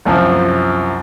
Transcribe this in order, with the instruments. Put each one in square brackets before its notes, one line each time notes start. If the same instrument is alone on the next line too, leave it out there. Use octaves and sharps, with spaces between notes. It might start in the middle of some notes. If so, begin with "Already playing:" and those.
[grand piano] C2 F#2 F3